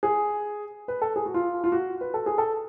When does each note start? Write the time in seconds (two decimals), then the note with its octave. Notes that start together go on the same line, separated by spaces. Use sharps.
0.03 G#4
0.88 B4
1.02 A4
1.16 G#4
1.26 F#4
1.34 F4
1.64 F4
1.72 F#4
2.01 B4
2.14 A4
2.26 G#4
2.38 A4